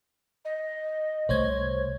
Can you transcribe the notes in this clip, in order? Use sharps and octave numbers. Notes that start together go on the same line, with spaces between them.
D#5
C2 A3 C5 C#5 G#6